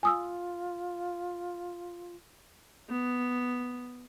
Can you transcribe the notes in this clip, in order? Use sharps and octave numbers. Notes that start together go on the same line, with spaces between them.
F4 G#5 D#6 E6
B3